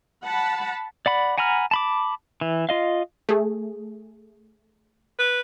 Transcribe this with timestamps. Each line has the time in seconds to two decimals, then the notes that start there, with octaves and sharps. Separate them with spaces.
0.25 F#5 A5 B5
1.06 D5 F#5 B5
1.38 F#5 G#5 A#5 B5 F6
1.71 A5 B5 D6
2.41 E3
2.69 F4 D#5 F5
3.29 A3 G#4
5.19 B4